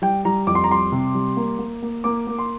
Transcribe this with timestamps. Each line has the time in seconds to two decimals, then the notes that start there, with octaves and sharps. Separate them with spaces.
0.02 G3 G5
0.25 G3 A#5
0.47 F2 D6
0.55 C6
0.64 A#5
0.70 G3 C6
0.92 C3
1.15 G3
1.37 A#3
1.59 A#3
1.82 A#3
2.04 A#3 D6
2.27 A#3
2.39 C6